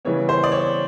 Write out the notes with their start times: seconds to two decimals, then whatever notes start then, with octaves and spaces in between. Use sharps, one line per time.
0.05 C#3 E3 G3 B3 C#5
0.29 C5
0.44 D5
0.52 C#5